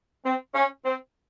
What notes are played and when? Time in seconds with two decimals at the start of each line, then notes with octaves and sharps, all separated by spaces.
0.25 C4
0.54 C#4
0.84 C4